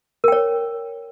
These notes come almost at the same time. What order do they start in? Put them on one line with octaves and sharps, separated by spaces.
A#4 G5 C#5